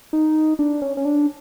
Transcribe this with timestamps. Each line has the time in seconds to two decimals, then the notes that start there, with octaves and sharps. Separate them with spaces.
0.13 D#4
0.59 D4
0.82 C#4
0.97 C#4
1.05 D4